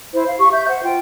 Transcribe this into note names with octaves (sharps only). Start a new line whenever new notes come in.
E4 C5
F5
G4 C#6
E5 G6
C5 F#5
F4 G5